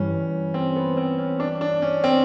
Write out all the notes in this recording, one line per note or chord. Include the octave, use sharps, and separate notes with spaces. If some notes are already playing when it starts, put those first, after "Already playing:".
Already playing: G2 E3 G3 C#4
C4
B3
C4
C#4
D4
D4
C#4
C4